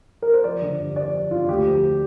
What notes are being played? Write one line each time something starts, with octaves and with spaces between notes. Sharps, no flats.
A#4
C5
F3 D5
D3
G2
F3 D5
F3
G2 F4
D2 G4
F3